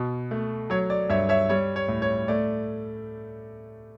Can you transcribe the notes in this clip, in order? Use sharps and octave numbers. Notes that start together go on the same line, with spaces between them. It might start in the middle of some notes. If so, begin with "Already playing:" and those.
Already playing: B2
A3
F#3 C#5
D5
G2 C#5 E5
C#5 E5
G3 C#5
C#5
A2
C#5
A3 D5